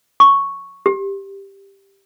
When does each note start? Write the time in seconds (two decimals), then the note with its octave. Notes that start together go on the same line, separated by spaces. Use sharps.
0.20 C#6
0.86 G4